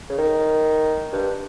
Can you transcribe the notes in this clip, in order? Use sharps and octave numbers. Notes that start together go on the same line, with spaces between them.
C#3
D#3
G2